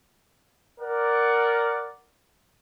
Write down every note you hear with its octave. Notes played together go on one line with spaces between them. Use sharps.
A#4 D5 F#5